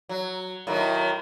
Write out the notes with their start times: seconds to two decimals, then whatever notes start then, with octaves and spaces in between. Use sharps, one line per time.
0.09 F#3
0.67 A2 D#3 F#3